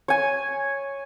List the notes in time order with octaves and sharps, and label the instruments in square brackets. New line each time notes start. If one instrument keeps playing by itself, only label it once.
[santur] C#5 G#5